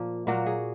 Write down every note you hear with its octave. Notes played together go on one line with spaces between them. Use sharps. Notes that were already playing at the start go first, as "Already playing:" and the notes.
Already playing: A#2 F3 A#3
A#2 F#3 A#3 F#4
G#4